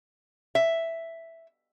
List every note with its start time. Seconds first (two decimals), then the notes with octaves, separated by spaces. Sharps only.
0.55 E5